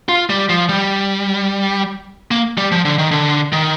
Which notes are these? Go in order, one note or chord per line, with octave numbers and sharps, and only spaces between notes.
F4
G3
F3
G3
A#3
G3
F3
D3
D#3
D3
D#3